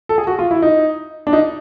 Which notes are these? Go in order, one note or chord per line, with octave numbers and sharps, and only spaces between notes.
A4
G#4
F#4
F4
E4
D#4
D4
D#4